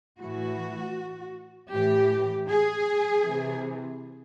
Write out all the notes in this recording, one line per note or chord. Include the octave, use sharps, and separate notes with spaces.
A2 E3 F#4
A2 E3 G4
G#4
C3 E3